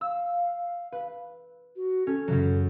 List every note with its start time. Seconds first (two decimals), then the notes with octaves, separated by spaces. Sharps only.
0.01 F5 E6
0.92 B4
1.76 F#4
2.07 C#4 A4
2.28 F#2 C#3 F#3